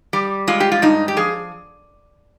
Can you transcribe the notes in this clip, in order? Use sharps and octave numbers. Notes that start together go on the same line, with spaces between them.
G3
G#3 F4
G4
F4
G2 D#4
G4
F3 G#4